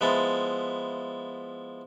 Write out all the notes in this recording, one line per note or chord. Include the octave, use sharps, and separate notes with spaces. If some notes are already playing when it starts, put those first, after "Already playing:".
F3 G#3 B3 E4 A5